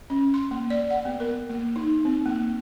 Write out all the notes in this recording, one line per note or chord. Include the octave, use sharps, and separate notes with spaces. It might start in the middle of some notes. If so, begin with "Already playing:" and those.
C#4
C6
A#3
D5
F#5
B3
A#4
A#3
D#4
C4
A#3